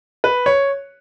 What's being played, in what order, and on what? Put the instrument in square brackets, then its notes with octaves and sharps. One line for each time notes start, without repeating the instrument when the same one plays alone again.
[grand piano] B4
C#5